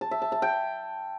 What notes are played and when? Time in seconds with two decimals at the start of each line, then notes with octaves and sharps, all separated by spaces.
0.01 A5
0.11 E5
0.22 A5
0.32 A5
0.42 G5